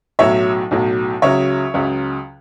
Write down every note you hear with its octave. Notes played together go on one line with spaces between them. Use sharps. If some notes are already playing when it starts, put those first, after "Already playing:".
B1 A2 F#3 C#5 E5
B1 A2 F#3
C#2 C#3 F#3 C#5 E5
C#2 C#3 F#3